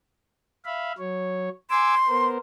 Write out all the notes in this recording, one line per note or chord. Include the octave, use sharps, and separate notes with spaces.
E5 F5 B5
F#3 C#5
G#5 C6 D6 E6
B3 A#4 C5